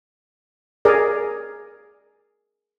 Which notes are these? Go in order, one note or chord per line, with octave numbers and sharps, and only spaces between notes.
G#4 A#4 D5